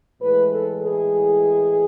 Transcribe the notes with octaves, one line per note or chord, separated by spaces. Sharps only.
A2 E3 G#3 B4
A4
G#4